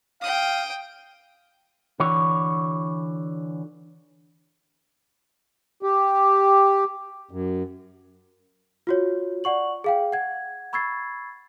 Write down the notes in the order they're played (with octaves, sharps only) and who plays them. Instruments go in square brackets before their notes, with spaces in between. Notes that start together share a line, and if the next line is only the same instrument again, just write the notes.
[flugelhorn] F5 [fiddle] G5 D#6
[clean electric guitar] D3 E3 F#4 C#5
[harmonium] G4
F#2
[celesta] F4 F#4 C#5
D5 F#5 C#6 F#7
G#4 F5 G5
F#5 G#6
B5 C#6 E6 G#6 A6 C7